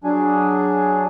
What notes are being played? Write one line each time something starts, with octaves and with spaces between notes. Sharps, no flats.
F#3 D4 G#4